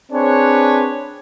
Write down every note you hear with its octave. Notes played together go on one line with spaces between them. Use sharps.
C4 D4 G#4 B4 C#5